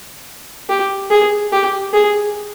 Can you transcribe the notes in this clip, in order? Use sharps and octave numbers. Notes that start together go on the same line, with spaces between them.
G4
G#4
G4
G#4